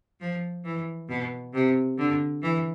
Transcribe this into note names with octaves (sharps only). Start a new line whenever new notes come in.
F3
E3
B2
C3
D3
E3